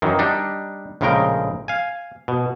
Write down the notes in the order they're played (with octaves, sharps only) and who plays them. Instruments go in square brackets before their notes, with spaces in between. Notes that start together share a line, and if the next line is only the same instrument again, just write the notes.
[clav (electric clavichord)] F#2 D#3 E3
G3 D4 D#4
A#1 A2 C#3 G#3 A#4 G5
F5 G#5
B2